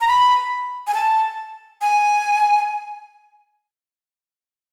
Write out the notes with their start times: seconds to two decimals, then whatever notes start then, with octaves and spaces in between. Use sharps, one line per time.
0.01 A#5
0.08 B5
0.87 G#5
0.94 A5
1.81 G#5